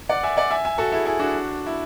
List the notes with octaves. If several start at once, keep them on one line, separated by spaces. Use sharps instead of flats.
D5 F#5
E5 G#5
D5 F#5
E5 G#5
E5 G#5
F#4 A4
E4 G#4
E4 G#4
D4 F#4
E4